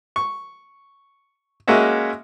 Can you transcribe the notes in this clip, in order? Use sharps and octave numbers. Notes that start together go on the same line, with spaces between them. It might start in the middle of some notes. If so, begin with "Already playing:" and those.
C#6
G#3 A#3 C#4 F#4 E5